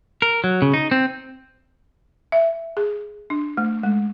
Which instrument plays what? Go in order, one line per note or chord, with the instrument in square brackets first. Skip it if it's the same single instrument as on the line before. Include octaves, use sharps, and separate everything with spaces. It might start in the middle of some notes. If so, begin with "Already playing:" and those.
[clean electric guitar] A#4
F#3
C#3
D#4
C4
[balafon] E5
G#4
D4
A3
G#3